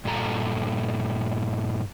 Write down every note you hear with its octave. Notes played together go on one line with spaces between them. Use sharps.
G2 A#2 A4 A#5